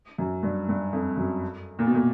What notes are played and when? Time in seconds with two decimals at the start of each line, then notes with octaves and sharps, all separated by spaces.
0.18 F#2
0.43 G2
0.68 G2
0.93 F2
1.17 F#2
1.79 A#2
1.86 B2
1.94 A#2